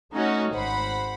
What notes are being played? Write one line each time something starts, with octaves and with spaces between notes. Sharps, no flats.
A3 C#4 D#4 F#4
G#1 C5 F#5 B5